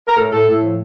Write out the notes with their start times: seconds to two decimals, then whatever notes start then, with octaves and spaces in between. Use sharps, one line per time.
0.07 A#4
0.16 A2 A4
0.32 A2 A4
0.47 A2
0.63 F3